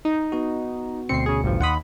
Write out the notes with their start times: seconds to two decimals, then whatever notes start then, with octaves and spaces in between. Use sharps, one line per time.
0.05 D#4
0.32 B3 F#4
1.09 D2 B2 C4 C7 C#7
1.26 C#3 G#4
1.43 A1 G2 F3
1.61 D#2 F#5 B5 C6 D#6